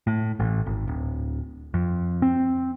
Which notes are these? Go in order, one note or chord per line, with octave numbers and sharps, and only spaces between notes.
A2
A1
G#1
D1
F2
C4